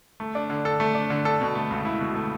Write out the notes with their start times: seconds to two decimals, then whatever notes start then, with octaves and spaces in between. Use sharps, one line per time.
0.20 A3
0.35 D4
0.50 D3
0.65 A4
0.80 A3
0.95 D4
1.10 D3
1.25 A4
1.41 B2
1.55 A3
1.70 C#2
1.85 E4
2.01 B2
2.15 A3